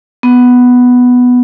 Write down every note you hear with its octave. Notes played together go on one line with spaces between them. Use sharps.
B3